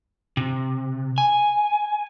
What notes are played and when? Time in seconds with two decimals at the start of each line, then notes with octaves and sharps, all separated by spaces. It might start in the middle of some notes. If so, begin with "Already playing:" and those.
0.37 C3
1.18 G#5